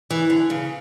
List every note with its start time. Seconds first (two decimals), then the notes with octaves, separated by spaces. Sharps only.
0.10 E3
0.30 D3
0.50 C#3